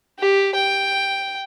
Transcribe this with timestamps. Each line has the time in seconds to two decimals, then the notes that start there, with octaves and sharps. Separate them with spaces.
0.19 G4
0.55 G5